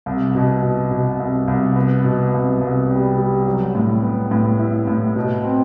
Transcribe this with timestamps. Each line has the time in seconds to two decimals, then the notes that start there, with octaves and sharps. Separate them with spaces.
0.06 C2
0.35 B2
0.62 B2
0.91 B2
1.19 C2
1.48 C2
1.76 B3
2.04 B2
2.33 C2
2.61 C2
2.89 G3
3.18 G3
3.47 F#3
3.75 A2
4.02 B3
4.31 A2
4.59 E4
4.87 A2
5.16 B2
5.44 C4